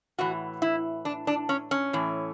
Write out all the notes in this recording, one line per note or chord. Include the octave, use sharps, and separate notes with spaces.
A2 E3 F#4
E4
D4
D4
C#4
C#4
A2 E3